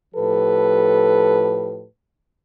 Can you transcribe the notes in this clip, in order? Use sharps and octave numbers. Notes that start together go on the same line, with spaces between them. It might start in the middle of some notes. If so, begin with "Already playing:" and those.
A2 F3 G4 A4 B4